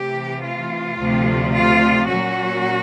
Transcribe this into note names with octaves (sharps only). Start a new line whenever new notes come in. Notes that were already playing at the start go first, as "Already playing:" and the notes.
Already playing: C3 E3 A3 G4
F4
D2 C3 F3 A3
F4
A#2 F#3 A#3 C#4 F#4